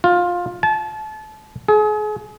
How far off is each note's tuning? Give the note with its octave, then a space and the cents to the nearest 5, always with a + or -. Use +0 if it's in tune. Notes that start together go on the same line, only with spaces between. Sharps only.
F4 +15
A5 -30
G#4 +35